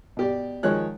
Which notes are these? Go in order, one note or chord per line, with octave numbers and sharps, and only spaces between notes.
B2 G4 D5
D#3 F3 G#3 C#5 F#6